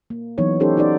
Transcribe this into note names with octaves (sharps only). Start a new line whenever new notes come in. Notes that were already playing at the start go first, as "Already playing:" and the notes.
A#3
E3 F#3 B3 D#4 C#5
C#4 D#4 G4 A4 C5
D#4 F#4 C5 D5